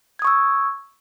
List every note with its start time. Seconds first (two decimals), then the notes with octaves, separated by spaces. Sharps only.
0.19 G#6
0.22 D#6
0.25 C#6
0.27 E6